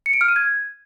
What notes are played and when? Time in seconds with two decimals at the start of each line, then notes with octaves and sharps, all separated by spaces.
0.06 C#7
0.13 D7
0.21 F6
0.28 D#7
0.36 G#6